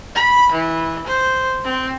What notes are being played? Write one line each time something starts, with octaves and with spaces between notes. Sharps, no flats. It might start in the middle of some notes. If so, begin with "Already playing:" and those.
B5
E3
C5
C4